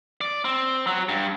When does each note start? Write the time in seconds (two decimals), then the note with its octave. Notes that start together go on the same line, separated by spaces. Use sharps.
0.21 D5
0.45 C4
0.87 F#3
1.09 G2